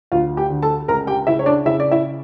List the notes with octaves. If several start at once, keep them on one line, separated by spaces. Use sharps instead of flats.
D2 F4 F5
G4 G5
D3
A4 A5
C#2 A#4 A#5
G4 G5
C#3 E4 E5
C#5
D4 D5
C#3 E4 E5
D5
E4 E5